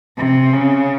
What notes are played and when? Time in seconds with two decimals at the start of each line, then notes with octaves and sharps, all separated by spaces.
0.18 C3
0.52 C#3